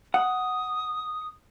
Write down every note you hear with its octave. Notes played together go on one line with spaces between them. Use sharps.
F#5 D#6